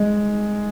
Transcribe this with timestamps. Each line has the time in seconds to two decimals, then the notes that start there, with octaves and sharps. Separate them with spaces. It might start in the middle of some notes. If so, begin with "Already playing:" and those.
Already playing: G#3